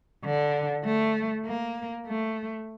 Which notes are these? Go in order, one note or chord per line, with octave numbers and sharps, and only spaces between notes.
D3
A3
A#3
A3